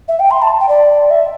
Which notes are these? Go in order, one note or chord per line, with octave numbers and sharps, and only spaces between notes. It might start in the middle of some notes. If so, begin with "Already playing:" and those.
E5
G5
C6
A5
G5
D5
E5